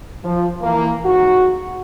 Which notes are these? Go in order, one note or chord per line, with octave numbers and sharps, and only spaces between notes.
F3
E3 A#3
G#2 F#4